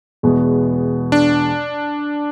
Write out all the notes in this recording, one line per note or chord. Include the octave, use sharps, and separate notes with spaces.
E2 B2 G#3 B3
D4